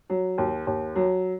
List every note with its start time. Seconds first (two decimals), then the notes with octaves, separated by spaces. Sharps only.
0.10 F#3
0.38 D#2
0.67 D#2
0.96 F#3